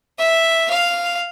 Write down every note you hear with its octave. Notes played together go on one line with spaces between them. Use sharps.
E5
F5